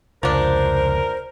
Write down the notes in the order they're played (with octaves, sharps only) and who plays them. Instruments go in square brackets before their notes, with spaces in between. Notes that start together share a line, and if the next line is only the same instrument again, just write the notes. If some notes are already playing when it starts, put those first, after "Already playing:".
[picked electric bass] F1 C#2 [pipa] F3 D4 [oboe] A#4 [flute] C5